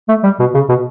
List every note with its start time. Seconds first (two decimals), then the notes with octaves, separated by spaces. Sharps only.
0.09 A3
0.23 G3
0.39 B2
0.54 C#3
0.69 B2